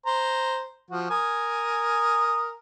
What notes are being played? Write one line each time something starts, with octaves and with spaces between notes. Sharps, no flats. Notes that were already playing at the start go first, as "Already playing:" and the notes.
C5 A#5
F3 F#4
A#4 G#5 D#6